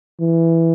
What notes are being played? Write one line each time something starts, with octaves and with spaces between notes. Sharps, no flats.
E3